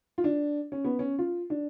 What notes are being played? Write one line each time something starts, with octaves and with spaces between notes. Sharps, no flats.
F4
D4
C#4
B3
C#4
F4
D4